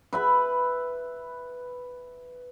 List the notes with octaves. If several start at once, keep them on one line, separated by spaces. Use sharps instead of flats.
B4 E5 B5